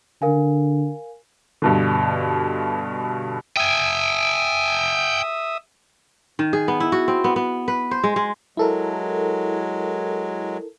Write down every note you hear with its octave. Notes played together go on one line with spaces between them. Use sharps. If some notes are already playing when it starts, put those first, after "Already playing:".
D3 A#4 F5 G#5
G2 B2 D3
E5 G5 G#5 D#6
D#3
G#4
B3
E4
F#4
C4
B3
B3
B4
C5
G#3
G#3
F#3 G#3 E4 A4 A#4